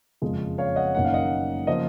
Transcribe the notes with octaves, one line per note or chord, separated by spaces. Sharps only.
F#1 F2 C#3 F3 G#3
C#5 F5
D#5 F#5
F#1 F#2 D#3 A#3 F#5
F5
D#5 F#5
C#3 F3 A#3 C5 D#5